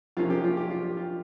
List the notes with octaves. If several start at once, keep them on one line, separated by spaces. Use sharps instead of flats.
F2 C3 F3 A#3 C#4 F4
G4
F4
G4
F4
F4